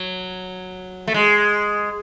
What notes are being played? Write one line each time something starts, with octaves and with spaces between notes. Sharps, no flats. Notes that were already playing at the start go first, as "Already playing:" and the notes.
Already playing: F#3
A3
G#3